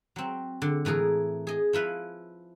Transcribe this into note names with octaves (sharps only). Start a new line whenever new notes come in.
F#3 C4
D3
A2 E3 A3 G#4 A#4
G#4 D#5
F3 E4 B4 F5